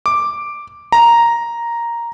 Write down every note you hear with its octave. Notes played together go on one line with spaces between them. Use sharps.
D6
A#5